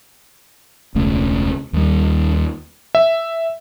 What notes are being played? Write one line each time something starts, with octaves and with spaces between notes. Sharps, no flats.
E1 C#2 C#3 A3
D#2 G3
E5